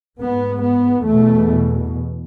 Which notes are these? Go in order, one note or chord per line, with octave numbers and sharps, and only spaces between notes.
G#2 B3
B3
E2 A3
B2